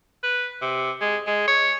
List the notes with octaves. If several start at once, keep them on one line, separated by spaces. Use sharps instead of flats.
B4
C3
G#3
G#3
C#5